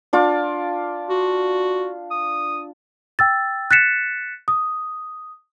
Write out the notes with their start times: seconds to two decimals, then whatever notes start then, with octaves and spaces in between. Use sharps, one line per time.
0.13 D4 F4 D6
1.10 F#4
2.11 D#6
3.19 G5 E6 A6
3.71 F#6 A6 B6 C#7 E7
4.48 D#6